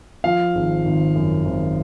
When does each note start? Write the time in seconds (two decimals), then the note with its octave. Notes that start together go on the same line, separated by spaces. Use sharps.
0.24 F3 F5
0.55 G#1
0.85 G#1
1.15 F#2
1.45 G#1